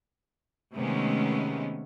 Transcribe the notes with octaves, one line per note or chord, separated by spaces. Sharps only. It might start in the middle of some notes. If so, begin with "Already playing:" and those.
C3 D#3 G#3 A3 B3 C#4